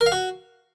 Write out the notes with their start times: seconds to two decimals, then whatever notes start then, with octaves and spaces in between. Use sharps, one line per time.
0.01 A#4
0.06 F5
0.12 F#4